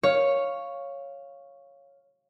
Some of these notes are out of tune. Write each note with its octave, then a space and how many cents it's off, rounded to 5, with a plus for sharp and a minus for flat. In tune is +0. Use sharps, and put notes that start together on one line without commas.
C#5 +0 F5 +0